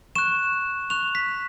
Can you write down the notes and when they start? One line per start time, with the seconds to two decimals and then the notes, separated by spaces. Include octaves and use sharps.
0.15 C#6 F#6 E7
0.90 C#6 F#6 F7
1.15 B6